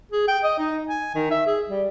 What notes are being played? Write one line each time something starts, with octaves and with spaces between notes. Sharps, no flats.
G#4
G5
D#5
D#4
G#5
D#3
E5
G#4
G3